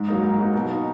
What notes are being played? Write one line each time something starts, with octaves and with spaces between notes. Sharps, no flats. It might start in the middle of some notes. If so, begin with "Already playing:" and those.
Already playing: G#2
F#3 A#3 D#4
G#2
F#3 A#3 D#4
B2
A#3 D#4